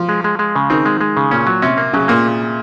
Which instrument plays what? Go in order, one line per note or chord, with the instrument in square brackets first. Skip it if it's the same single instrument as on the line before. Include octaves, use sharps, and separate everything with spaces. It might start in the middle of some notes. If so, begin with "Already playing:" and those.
Already playing: [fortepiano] F3
[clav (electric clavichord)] G#3
G#3
G#3
C#3
[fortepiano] D#3 [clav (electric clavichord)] C4
[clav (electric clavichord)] G#3
G#3
C#3
[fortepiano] A#2 [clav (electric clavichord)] C#4
[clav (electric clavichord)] F#3
[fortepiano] C3 [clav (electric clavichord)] C#4
[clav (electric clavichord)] A#3
[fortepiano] C#3 [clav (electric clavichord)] F#3
[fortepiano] A#2 [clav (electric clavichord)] A#3